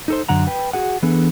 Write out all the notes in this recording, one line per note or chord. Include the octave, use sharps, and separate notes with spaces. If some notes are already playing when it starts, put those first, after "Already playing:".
D#4 A4 C5
F#2 D3 F#5 A#5
B4 G5
F#4 G#4 F#5
E3 B3 D4 G#4 A4